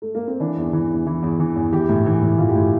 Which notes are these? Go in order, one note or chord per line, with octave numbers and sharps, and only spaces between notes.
A3
A#3
C4
E3 D4
E2
E3
E2
E3 E4
E2
E3
E2
E3 G4
A2
E3
A2
E3 F4
G4
A2 F4